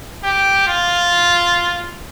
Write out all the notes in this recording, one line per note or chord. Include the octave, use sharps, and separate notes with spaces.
G4
F4